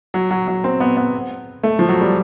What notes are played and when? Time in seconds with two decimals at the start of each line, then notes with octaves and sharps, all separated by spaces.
0.14 F#3
0.31 F#3
0.48 F#3
0.64 C4
0.80 B3
0.97 B3
1.63 A3
1.79 F3
1.89 F#3
2.01 G3